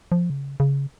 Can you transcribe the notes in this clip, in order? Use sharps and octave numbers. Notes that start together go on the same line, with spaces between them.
F3
C#3
C#3